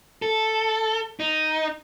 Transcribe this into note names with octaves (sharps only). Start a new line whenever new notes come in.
A4
D#4